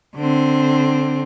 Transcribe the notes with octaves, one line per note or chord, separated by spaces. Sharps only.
D3 C4